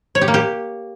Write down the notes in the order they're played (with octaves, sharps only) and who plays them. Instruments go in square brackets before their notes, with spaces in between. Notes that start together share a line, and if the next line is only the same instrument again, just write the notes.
[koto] C#5
G4
A#3
G4